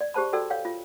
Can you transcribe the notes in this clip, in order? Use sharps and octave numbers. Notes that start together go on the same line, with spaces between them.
D5
G4 G#4 C5 A5 B5
F#4 A4 D5 G5 E6
C#5 F5 G5
F4